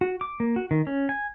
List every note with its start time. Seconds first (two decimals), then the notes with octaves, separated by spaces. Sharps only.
0.01 F#4
0.21 D6
0.40 A#3
0.56 F#4
0.71 D#3
0.87 C#4
1.09 G#5